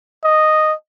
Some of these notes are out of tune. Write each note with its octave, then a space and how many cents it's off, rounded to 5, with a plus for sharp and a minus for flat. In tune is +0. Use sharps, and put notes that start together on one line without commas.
D#5 -5